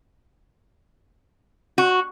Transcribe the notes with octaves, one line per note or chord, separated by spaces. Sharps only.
F#4